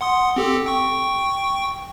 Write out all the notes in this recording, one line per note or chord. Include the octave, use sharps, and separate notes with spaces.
F#5 C6 D#6
C4 G4 A4
G5 C#6